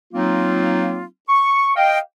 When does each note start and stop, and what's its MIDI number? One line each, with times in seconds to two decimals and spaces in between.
0.14 1.04 54
0.14 1.04 58
0.14 1.04 60
0.14 1.04 63
0.14 1.04 65
1.29 1.73 85
1.76 1.98 75
1.76 1.98 77
1.76 1.98 79